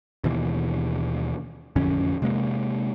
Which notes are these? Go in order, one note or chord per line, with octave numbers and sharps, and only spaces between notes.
D#2 B2 E3
A1 F2 D3 C#4
C3 G#3 A#3